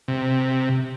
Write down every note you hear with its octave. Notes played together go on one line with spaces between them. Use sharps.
C3